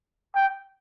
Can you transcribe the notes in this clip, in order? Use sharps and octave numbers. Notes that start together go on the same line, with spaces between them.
G5